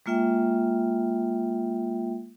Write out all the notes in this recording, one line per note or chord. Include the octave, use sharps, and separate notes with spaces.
G#3 A#3 F4 E5 G5